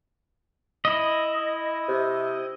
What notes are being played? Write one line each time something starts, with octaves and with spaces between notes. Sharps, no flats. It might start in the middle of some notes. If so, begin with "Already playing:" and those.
E4 D#5
C3